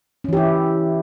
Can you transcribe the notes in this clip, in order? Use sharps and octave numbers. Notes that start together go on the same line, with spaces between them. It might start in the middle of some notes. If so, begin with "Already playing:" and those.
E3 C#4 E4 G4